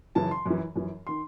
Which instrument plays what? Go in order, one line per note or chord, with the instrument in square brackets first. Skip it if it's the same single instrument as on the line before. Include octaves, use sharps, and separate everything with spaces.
[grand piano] F#2 C#3 E3 A5
C6
F#2 E3
F#2 E3
D#3 C6